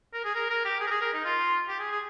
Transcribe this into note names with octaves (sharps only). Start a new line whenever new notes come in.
A#4
G#4
A#4
A#4
G4
G#4
A#4
G#4
A#4
D#4
F4
G4
G#4
G#4